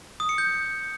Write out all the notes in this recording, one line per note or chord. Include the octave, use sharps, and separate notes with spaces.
D#6
C#7
G6